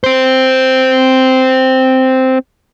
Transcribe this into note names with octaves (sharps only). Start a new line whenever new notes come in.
C4 C5